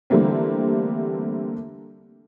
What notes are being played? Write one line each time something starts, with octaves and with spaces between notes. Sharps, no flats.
D3 E3 G3 A3 A#3 C4